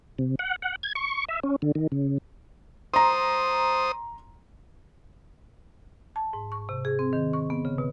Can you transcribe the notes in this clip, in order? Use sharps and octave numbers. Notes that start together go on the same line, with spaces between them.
C3
F#5
F#5
G#6
C#6
E5
C#4
D3
D#3
C#3
C5 A#5 C6 D#6
A5
G#2
C#6
C3
G#4
C4
D#3
C#6
B3
C#3
B2